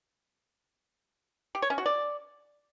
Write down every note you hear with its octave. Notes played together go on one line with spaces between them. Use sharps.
G4
C#5
C#4
F#4
D5